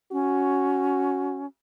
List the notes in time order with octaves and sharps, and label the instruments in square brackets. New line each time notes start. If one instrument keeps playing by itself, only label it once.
[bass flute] C#4 [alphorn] F#4